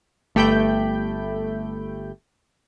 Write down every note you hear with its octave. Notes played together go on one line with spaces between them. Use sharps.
G1 A3 G4 G5 B5 G6